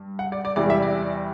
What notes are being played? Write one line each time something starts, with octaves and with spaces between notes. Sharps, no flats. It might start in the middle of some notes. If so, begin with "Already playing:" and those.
Already playing: G2
F#5
D5
D5
E2 C3 E3 G3 D5
E5
D5